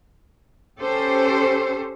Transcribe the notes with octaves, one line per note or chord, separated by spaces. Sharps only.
C#4 G4 A4 C5